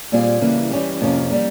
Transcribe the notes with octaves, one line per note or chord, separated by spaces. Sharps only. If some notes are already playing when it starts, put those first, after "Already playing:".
A#2 G3 C4 F4 G#4
C#3 E3 G3 A#3
E3 G3 C#4 G4
F2 C3 F3 A#3 C#4
G3 A#3